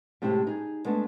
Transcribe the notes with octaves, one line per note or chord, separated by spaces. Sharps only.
A2 C3 G#3 C4 E4 G4
D#4 G#4
G#3 A3 B3 D4 A4